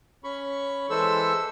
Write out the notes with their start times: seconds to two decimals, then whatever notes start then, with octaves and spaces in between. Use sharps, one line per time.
0.24 C#4 B5 C#6
0.90 E3 G#3 A4 C5 E6